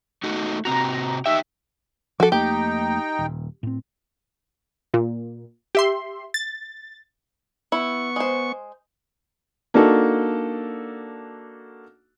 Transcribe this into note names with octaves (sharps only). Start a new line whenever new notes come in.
A3 D#4 F#4
C3 C4 F#4 A#5
D#4 G4 E5 G5
F3 F#4 A4 D6
F2 A3 A#3 D#4 G4 G5
D#1
A2 C4
A#2
G4 E5 C6
A6
B3 E4 C#6
G#3 C5
A#3 D4 D#4 F#4 A4